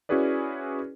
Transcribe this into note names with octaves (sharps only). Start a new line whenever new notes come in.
C#4 E4 F#4 G#4 B4 D5